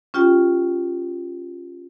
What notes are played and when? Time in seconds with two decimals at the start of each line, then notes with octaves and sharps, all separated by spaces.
0.14 C#4 F4 G4 G5